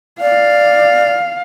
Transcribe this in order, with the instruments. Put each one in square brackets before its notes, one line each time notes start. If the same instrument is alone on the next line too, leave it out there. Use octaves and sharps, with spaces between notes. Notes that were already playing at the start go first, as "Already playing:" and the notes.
[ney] D5 [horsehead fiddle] F5